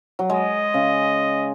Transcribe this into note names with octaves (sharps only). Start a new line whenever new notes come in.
F#3
G#3 D#5
C#3